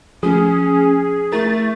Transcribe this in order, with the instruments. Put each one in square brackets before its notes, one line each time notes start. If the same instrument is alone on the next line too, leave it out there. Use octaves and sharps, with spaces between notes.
[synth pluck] F3 A3 [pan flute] C#4 [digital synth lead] G#4
[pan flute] A3 [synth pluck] E4 A#4 [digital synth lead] A6